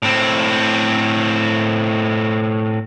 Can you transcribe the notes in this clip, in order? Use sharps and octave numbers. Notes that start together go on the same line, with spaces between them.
A2 C4